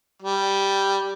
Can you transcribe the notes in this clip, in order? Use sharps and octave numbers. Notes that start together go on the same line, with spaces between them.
G3